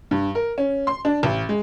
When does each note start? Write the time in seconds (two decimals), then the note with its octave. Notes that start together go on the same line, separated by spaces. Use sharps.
0.11 G2
0.35 A#4
0.58 C#4
0.87 C6
1.05 D4
1.23 A1
1.49 G#3